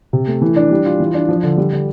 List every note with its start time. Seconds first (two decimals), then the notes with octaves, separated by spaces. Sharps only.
0.13 C3
0.27 A3
0.42 E3
0.56 D4
0.71 G3
0.86 F4
1.00 E3
1.14 D4
1.29 F3
1.43 D3
1.57 G3
1.73 D3